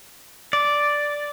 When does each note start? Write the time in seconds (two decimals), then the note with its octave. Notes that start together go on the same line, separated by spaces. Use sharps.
0.53 D5